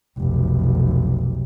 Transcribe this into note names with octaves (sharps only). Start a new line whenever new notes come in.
F1 B1